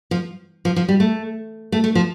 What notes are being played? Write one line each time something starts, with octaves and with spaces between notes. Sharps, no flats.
F3
F3
F3
G3
A3
A3
A3
F3